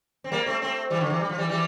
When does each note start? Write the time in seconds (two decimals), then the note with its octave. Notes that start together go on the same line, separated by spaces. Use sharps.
0.24 C4
0.32 G3 A#3
0.46 A3 C4
0.62 A3 C4
0.90 E3 G3
1.00 D3 F3
1.10 C3 E3
1.20 G3
1.29 F3
1.38 E3 G3
1.49 E3 G3